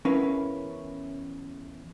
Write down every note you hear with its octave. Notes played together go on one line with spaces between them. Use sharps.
E2 C#4 E4 A#4 B4 F5